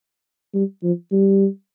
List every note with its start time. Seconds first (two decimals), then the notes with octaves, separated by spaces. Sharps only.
0.54 G3
0.83 F3
1.12 G3